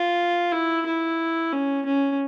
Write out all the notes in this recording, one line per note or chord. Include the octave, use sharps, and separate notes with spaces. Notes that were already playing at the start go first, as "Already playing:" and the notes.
Already playing: F4
E4
E4
C#4
C#4